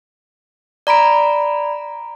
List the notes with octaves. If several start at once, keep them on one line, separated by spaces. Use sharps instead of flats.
D5 A#5 B5 D7